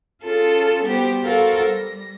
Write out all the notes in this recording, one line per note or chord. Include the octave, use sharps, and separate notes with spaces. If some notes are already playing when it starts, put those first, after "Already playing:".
C#4 F4 G#4 A4
G3 B3 F#4 G4 C5
F#4 A4 A#4 C5 F5
G3 A#6